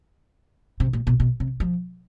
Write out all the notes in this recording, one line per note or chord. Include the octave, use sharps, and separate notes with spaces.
C3
A#2
B2
B2
C3
F3